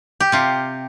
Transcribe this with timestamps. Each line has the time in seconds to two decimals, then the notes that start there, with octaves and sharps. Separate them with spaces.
0.20 G4
0.32 C3 F4